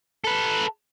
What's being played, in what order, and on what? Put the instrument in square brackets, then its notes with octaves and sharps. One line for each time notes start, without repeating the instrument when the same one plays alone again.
[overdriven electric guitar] A4 B4